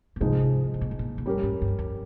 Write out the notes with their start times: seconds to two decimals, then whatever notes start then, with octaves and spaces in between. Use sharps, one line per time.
0.16 A#2
0.21 G#2 C3 F3 G#3 D#4
0.74 C3
0.81 A#2
0.91 G#2
0.99 A#2
1.18 A#2
1.26 G#2 G3 C#4 G4 A#4
1.43 G#2
1.62 G2
1.79 F2